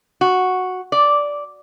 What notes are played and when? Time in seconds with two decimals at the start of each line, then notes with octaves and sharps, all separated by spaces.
0.21 F#4
0.92 D5